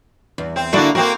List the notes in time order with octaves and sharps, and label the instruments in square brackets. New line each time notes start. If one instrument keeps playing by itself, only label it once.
[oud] E2
[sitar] C4
[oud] D3 D4 E4 [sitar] A#3 F#4
[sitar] A#3 C4 F#4 [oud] A#4